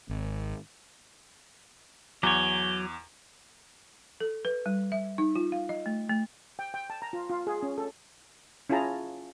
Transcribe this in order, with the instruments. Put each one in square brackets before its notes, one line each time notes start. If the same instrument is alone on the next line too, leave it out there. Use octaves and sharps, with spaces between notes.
[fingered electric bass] G#1
[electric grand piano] E2 D6 [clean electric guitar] F#3 C#5 [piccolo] G7
[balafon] A4
B4
G3
E5
D#4
F4
F5
D#5
A3
A3
[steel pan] G5
G5
A5
A#5
F4
F4
G#4
C#4
A4
C#4 E4 F4 G#4 A5 A#5